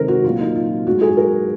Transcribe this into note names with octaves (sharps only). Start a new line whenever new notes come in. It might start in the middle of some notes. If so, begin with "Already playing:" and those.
Already playing: C3 D#3 G#3 A#4 C5
F#4
A#2 F#3 F4
D#4
F4
G#2 F#3 F#4
G#4
A#4